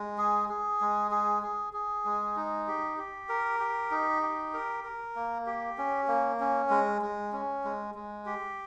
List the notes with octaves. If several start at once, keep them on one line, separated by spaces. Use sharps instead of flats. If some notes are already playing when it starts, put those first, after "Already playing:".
Already playing: G#3
G#4
G#4
G#3
G#4
G#4
G#4
G#3
D#4
G4
G4
A#4
G4
D#4
G4
A#4
A#4
A#3
G4
C#4
A#3
C#4
G#3
G#3
C#4
G#3
G#3
G4